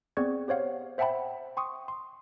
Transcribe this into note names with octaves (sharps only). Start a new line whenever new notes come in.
B3 C4 G#4 D5 C#6 G#6
G4 C5 C#5 F5 F#5
C5 E5 F#5 G5 A5 B5
G5 C6 C#6 D#6
C6